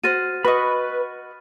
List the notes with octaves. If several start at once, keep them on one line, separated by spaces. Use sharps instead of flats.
F#4 C5 F6 A6 D#7
F#4 B4 D#5 B5 C#6